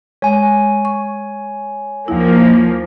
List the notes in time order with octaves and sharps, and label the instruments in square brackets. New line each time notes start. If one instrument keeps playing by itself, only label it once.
[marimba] G#3 [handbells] C#5 G#5
[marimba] C#6
[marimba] D#2 E4 [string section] F3 A#3